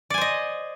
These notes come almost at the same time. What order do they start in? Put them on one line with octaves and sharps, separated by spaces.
D5 G#5 C5 D#5